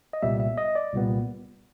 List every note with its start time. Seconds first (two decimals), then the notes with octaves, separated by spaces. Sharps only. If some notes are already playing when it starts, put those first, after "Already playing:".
0.13 D#5
0.22 C2 A#2 G3 B3 E5
0.40 E5
0.58 D#5
0.75 D5
0.93 C2 A#2 G3 B3